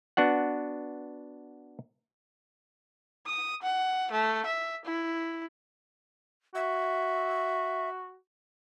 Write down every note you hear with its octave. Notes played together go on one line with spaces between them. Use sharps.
B3 D4 F#4 F#5
D#6
F#5
A3
E5
E4
F#4 E5